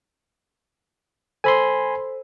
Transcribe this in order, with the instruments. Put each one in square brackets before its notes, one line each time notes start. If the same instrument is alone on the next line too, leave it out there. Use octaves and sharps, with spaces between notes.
[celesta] A4 C5 E6 [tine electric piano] G#5 B5 C6